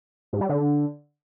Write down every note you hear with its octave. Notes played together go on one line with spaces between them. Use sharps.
G#2
G3
D3